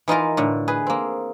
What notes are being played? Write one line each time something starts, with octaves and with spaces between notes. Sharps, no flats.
E3 D#4 F4 A#4
A2 D3
G#4 B4
A#3 C4